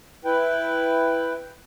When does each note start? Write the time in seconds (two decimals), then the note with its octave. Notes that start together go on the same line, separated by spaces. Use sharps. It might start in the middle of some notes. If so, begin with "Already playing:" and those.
0.25 E4 B4 G5